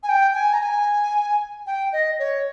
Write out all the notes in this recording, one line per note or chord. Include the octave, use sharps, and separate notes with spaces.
G#5
G5
G#5
A#5
G#5
G5
D#5
C#5